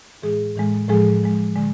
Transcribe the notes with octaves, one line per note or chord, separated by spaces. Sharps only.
A2 E3 G#3 G#4
A2 E3 G#3
A2 F3 G#3 G#4
A2 F3 G#3
D3 G#3